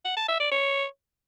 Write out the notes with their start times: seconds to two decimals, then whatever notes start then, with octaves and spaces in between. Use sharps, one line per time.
0.05 F#5
0.17 A5
0.28 E5
0.40 D5
0.52 C#5